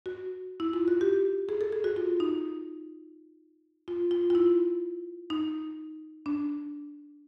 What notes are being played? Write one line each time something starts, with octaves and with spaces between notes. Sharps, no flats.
F#4
E4
F4
F#4
G4
G#4
A4
G#4
F#4
F4
D#4
F4
F4
F4
E4
D#4
D4